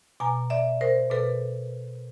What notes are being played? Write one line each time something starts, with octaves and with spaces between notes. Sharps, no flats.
B2 G#5 A#5
D5 E5
A#4 C5
B2 A4 B4